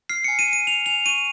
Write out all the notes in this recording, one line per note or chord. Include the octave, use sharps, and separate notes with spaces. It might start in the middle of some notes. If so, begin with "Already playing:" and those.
F6 C7
G#5 C#7
D#7
G#5
D#7
F6 F7
G#5 F7
C#6 D#7